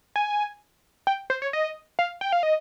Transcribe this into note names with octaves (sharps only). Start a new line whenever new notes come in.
G#5
G5
C5
C#5
D#5
F5
G5
F5
D#5